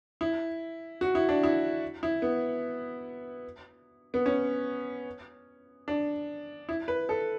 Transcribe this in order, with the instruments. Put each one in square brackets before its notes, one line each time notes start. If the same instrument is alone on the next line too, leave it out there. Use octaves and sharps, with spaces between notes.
[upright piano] E4
F#4
E4
D4
E4
E4
B3
B3
C#4
D4
E4
B4
A4